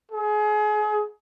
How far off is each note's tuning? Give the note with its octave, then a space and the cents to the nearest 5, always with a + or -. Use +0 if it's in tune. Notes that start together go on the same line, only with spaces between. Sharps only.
G#4 +30